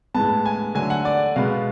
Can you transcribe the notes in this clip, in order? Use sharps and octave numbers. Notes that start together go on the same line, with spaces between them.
A2 G#3 B3 A5
G#5
D3 F#3 A3 G#5
F#5
D5
B2 G#3 B3 F5